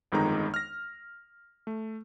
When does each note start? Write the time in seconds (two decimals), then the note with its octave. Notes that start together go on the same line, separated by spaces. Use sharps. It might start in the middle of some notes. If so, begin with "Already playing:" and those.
0.12 G1 F2 D#3 G#3 D#4 A#5
0.54 F6 A#6
1.67 A3